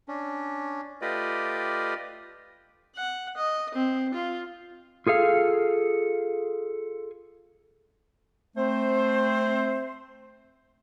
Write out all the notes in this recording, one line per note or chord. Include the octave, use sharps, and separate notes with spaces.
C#4 D4
A3 F4 G4 B4 D5 D#5
F#5
D#5
C4
F4
F4 G#4 A4 F5
A3 C4 C5